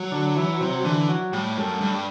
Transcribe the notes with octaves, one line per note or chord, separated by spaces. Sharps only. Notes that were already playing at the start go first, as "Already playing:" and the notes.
Already playing: F#3
D3
E3
C3
D3 E3
F#3
A2 G3
F#2 A3
G2
G3